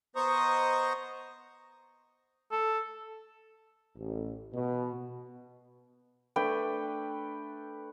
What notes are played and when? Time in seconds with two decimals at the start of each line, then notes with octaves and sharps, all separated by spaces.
0.16 B3 C5 D#5 A#5 C#6 D#6
2.52 A4
3.97 A1
4.54 B2
6.36 A3 D4 B4 G5